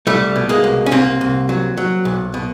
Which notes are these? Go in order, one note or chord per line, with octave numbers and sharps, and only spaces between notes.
C2 G3 A3
B2
G#3 A#3
C2
C#4
C2 A#3 C4
C2
F#3
F#3
B1
B2